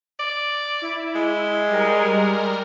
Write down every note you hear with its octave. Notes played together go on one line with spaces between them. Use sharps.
D5
E4
G#3
G3 A#4